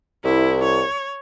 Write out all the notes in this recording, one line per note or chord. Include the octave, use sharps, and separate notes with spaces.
C2 E4
C#5